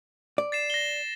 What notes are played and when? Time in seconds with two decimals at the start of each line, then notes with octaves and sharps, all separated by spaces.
0.38 D5
0.52 A6 C7 E7
0.70 A#6 G7